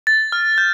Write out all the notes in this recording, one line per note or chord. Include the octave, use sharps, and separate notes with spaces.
A6
F6
G6